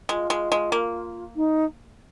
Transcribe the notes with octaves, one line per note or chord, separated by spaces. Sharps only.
G#3 F4
G#3
G#3
A#3
D#4